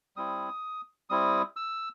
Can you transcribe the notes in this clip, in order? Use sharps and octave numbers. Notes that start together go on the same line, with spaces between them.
G3 C4 E4 D#6
G3 C4 E4 D#6
E6